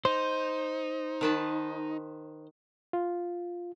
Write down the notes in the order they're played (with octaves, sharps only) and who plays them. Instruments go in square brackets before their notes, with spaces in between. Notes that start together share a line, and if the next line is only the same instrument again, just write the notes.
[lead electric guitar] D#4 [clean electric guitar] C5
[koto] D#3 B4 A5
[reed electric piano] F4